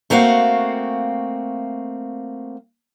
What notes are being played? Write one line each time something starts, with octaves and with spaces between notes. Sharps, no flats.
A3 A#3 C4 F#4 F5